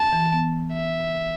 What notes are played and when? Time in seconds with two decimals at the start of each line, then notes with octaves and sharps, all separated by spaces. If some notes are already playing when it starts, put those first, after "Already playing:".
Already playing: A5
0.13 E3
0.32 B3
0.73 E5